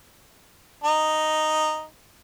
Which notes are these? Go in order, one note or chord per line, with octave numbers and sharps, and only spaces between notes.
D#4